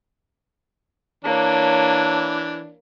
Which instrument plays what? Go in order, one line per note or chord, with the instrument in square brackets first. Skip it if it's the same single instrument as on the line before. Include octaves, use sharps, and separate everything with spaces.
[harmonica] E3 D4 [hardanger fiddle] A#3 C#5 [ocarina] A5